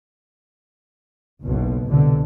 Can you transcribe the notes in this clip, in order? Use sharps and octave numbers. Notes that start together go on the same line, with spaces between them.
F#1 B1 B2
C2 B2 D3